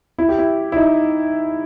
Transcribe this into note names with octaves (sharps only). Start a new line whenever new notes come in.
E4
G4
E4
E4
D#4